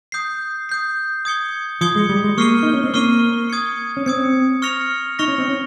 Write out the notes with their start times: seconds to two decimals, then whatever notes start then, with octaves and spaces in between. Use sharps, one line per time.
0.12 D#6 G6 C7
0.69 D#6 G6 C7
1.25 D#6 G#6 C#7 G7
1.81 F3 D#6 G#6 C#7 G7
1.96 G#3
2.09 G3
2.24 G#3
2.37 A#3 C#6 F6 C7 D#7 G7
2.63 D#4
2.73 C#4
2.84 C4
2.94 A#3 C#6 F6 C7 D#7 G7
3.50 D#6 G#6 C#7
3.97 C#4
4.06 C4 D#6 G#6 C#7
4.62 C#6 F6 A#6 C#7 F7
5.19 D#4 C#6 F6 A#6 C#7 F7
5.28 C#4
5.38 C4
5.48 C#4